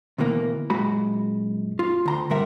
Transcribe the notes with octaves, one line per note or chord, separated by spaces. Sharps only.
D2 B2 E3 A#3
F#2 A#2 G#3 F#4 B5
F4
D2 A#5 C6
C2 G2 G3 A#4 E5 F#5